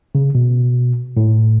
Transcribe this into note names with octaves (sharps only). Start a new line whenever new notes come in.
C#3
B2
A2